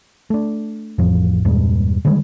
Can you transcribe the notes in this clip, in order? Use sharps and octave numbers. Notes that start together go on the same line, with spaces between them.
A3 D4
A1 F2 F3
E2 G2 A#2 G#3
D3 D#3 G3 G#3